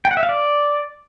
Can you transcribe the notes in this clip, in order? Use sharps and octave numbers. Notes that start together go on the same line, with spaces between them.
G5
F#5
E5
F5
D5